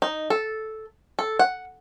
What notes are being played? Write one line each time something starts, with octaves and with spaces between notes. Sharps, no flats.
D#4
A4
A4
F#5